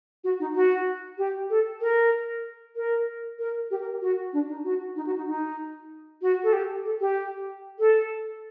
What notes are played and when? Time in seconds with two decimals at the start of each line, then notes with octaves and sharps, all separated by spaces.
0.24 F#4
0.40 D#4
0.55 F#4
1.18 G4
1.50 A4
1.81 A#4
2.76 A#4
3.39 A#4
3.71 G4
3.81 A#4
4.02 F#4
4.33 D4
4.49 D#4
4.64 F#4
4.96 D#4
5.07 F#4
5.17 D#4
5.28 D#4
6.22 F#4
6.44 A4
6.53 G4
6.85 A4
7.01 G4
7.79 A4